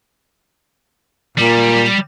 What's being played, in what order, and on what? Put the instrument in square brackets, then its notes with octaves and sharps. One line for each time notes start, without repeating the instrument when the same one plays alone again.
[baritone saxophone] A#2 [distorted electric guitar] G3